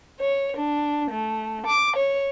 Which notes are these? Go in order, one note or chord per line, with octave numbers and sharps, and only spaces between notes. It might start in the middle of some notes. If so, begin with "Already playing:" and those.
C#5
D4
A3
D6
C#5